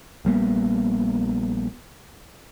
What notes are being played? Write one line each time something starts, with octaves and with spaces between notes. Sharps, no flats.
A#1 G3 A#3 B3